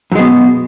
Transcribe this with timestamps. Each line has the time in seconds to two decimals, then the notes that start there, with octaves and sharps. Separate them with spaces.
0.12 F#2
0.15 G#3
0.19 B2